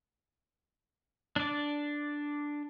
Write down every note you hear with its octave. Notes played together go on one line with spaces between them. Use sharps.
D4 D5